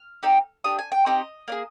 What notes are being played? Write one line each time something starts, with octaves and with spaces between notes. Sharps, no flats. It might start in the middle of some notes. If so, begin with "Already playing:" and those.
Already playing: F6
C4 D#4 G4
D4 G4 D#6
G#5
G5
C4 D#4 G4 D#5
A#3 D4 G#4